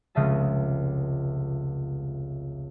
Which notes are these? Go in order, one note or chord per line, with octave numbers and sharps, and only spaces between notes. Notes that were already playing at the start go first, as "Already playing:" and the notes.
F1 C#2 C#3 D#5 E5 A5